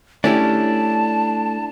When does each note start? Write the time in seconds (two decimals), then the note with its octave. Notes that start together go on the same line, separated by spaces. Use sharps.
0.24 A3 C#4 D4 E4 G4 A5